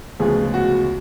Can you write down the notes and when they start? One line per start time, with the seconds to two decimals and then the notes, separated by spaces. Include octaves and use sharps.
0.19 D2 C#3 F3 G#3 B3 G#4
0.54 F#4